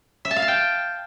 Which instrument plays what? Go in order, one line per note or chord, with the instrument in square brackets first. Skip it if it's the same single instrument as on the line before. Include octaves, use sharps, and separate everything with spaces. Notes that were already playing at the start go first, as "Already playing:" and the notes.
[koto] E5
A5
F5
A5
G5